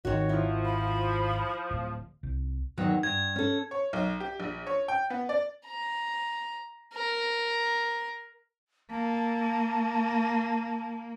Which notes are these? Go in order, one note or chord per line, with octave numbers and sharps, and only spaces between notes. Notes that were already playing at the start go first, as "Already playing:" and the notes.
G#1 D#3 F#4 C#5
F3 E4
B5
D1
C2
E2 D#3 F#3
G2 G#6
C#4 A4
C#5
B1
G4
A#1
C#5
G5
B3
D5
A#5
A#4
A#3 A5